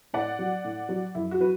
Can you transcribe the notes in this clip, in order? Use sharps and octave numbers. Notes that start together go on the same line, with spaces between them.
A2 D5 F#5
F#3
A2
F#3
F#2 E4
F#4
F#3 B4